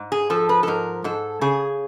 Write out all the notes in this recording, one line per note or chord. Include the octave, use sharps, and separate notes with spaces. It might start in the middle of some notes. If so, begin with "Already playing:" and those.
Already playing: G#2
G#4
F3 A4
B4
A4
G#2 A#4
G#2 A4
C#3 G#4